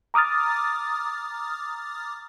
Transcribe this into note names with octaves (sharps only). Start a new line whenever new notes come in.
A#5 D6 D#6 F6 A6